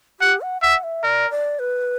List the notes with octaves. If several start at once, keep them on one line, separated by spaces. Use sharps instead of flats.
G4 F#5
F#5
E5 F#5
E5
A#4 D5
D5
B4